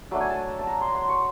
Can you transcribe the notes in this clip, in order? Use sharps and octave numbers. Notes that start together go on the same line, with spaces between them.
F#3 A3 D4 A5
G#5
A5
A5
A#5
C6
C6
C#6